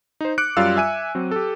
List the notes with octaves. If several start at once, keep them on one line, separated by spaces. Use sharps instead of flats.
D#4 C5
D6 F#6 C#7 D7
F#2 G3 F4 D5 F5 E6
E5 G#5 F#6 D#7
F#3 C4
G4 A4